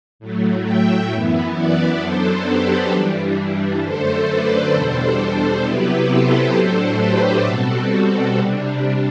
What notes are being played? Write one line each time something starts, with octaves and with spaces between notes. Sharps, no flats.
A2 F#3 A3
E5 G5
F#2 E3 B3 E4
B4 D5
F#2 F#3 B3 D4 A4 C5
G4 B4
G2 E3 G3 D4
F#2 D3 A3 A4 C5
B4 D5
E2 B2 G3 D4 A4 C5
C3 F#3 B3 E4 G4 B4
A4 C5
A2 F#3 A3 D4 A4 C5
G4 B4
B2 G3 C4 F#4 A4
C3 G3 D4